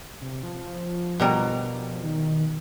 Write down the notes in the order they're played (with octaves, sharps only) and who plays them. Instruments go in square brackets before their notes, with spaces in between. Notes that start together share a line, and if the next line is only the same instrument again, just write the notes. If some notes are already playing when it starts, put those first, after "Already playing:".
[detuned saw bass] C3
F3
[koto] B2 G3 A#4
[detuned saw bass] D#3